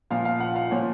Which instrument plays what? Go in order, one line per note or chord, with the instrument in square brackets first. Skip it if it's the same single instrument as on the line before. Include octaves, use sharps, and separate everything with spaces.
[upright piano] A#2 F3 F5
F5
F#5
F5
A#2 F3 C#5